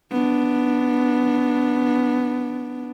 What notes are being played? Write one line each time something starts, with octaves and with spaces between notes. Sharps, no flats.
B3 D4